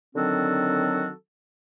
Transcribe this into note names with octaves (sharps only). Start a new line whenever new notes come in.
D3 D#3 F#3 C4 F#4 A4